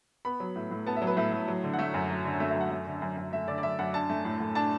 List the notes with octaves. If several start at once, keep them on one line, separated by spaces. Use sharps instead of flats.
B3 B5
F#3
A2
A2
B3 A5
E5
F#3
B4
A2 E5
A2
F#3
D3
F#5
A3 E5
F#2
F#3
D3
A3 E5
E5
F#2 F#5
A3 E5
D3
F#2
F#2
A3 E5
D3 D5
D5
F#2 E5
F#2 F#5
D4 A5
A3
A2
A2
D4 A5